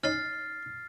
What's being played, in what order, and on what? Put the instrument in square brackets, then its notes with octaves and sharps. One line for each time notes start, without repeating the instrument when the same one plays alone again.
[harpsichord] C#4 D#4 [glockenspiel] F6 A6 C7